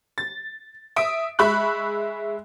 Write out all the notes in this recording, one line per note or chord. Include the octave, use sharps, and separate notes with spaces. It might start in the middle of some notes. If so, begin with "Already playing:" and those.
A6
E5 D#6 D7
G#3 E5 B5 C#6 F#6